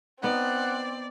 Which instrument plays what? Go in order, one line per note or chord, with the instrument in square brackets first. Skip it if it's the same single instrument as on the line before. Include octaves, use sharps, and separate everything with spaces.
[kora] B3 D#4 [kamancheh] C4 [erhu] D5 [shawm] F#5